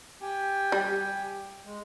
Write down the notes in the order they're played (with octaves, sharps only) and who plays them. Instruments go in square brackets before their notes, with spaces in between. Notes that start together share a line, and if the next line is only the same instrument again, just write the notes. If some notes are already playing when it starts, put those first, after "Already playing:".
[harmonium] G4 G5 G#5
[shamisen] G3
[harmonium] G#3